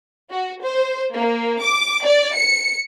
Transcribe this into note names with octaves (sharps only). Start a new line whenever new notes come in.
F#4
C5
A#3
D6
D5
C#7